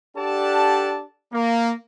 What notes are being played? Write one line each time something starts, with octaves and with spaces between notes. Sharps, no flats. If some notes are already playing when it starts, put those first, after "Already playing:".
D4 G4 A4 D5 F#5 A5
A#3